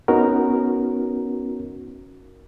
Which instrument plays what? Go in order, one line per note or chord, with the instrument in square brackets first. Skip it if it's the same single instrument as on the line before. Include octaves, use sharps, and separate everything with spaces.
[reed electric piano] B3 C#4 D#4 F#4 A#4